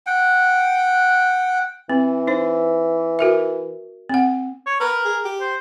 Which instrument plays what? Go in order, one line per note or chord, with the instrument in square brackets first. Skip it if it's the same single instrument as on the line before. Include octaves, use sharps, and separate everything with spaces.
[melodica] F#5 G5
[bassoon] E3 [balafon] C4
[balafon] D#4 C5
F#4 A#4 E5
C4 F#5
[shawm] C#5
[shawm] A#4 [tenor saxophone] B4
[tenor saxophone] G#4
G4
[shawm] C5